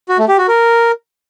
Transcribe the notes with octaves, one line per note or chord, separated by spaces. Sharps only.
F#4
A3
G4
F#4
A#4